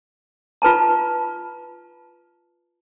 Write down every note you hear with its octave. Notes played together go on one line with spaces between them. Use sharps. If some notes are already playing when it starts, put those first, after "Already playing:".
F4 B4 A5 A#5